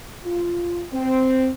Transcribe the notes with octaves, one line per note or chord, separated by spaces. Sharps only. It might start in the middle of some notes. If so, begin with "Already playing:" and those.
F4
C4